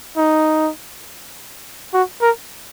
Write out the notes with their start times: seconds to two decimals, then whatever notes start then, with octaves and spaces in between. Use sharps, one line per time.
0.17 D#4
1.93 F#4
2.22 A#4